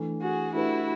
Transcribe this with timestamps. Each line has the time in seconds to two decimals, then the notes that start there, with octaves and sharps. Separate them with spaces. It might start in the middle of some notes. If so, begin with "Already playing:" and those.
Already playing: E3 A3 D4
0.21 F#4 G#4
0.54 A3 D4 E4 F#4 G4 B4